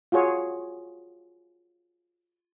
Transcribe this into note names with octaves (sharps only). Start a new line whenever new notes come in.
F4 F#4 G#4 C#5